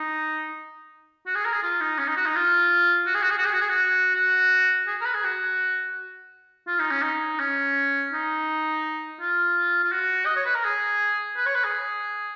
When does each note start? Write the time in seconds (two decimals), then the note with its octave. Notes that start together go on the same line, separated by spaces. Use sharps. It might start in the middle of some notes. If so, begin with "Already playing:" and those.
Already playing: D#4
1.26 F#4
1.35 G#4
1.45 A#4
1.53 G#4
1.62 F4
1.81 D#4
1.98 C#4
2.08 D#4
2.17 F#4
2.26 D#4
2.35 F4
3.06 F#4
3.14 G#4
3.22 F#4
3.30 G#4
3.37 F#4
3.45 G#4
3.53 F#4
3.61 G#4
3.69 F#4
4.15 F#4
4.87 G#4
5.01 A#4
5.05 B4
5.14 G#4
5.24 F#4
6.67 F4
6.79 D#4
6.91 C#4
7.02 D#4
7.39 C#4
8.12 D#4
9.20 F4
9.84 F4
9.92 F#4
10.26 D#5
10.36 C#5
10.45 B4
10.55 A#4
10.65 G#4
11.37 B4
11.46 C#5
11.55 B4
11.64 G#4